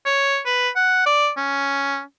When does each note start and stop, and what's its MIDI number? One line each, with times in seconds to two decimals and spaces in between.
0.06 0.39 73
0.46 0.69 71
0.76 1.02 78
1.06 1.30 74
1.37 2.02 61